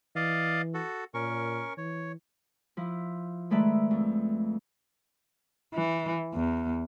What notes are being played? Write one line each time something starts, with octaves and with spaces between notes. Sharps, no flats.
E3 D5 D#5 F5
F#4 A4
A#2 C#4 A#4 C#6
E3 C#5
F3 E4
D#3 G#3 A3 B4 D5 E5
F2
E3
E2